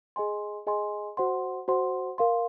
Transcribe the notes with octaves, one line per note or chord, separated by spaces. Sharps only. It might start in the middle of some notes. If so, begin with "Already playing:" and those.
G#4 D#5 G#5 C6
G#4 D#5 G#5 C6
F#4 C5 F#5 C6
F#4 C5 F#5 C6
A#4 F5 C6